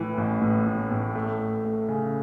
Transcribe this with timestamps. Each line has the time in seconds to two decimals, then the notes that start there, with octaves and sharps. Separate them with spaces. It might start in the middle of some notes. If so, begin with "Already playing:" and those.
Already playing: A2 E3
0.18 A1
0.42 A2
0.67 A2
0.91 A2
1.15 A3
1.40 A3
1.65 A3
1.89 C#3